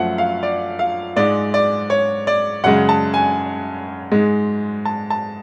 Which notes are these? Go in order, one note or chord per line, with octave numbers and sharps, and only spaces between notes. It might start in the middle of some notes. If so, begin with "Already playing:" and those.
Already playing: F#2 F3 A3 F#5
F5
D5
F5
G#2 G#3 D5
D5
C#5
D5
F#2 C#3 G#3 F#5
A5
G#5
G#2 G#3
A5
A5